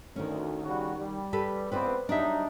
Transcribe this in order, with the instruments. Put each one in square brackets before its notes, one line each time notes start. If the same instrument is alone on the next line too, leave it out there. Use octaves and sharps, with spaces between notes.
[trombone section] D2 [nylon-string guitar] D#3 C#4
[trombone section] C#3 G3 F#4
G3
[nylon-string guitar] G4 A4 B4
[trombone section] C#2 B3 C4 [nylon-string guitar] B4 C5 D5
[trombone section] F#3 G3 D#4 [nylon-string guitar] D4 E5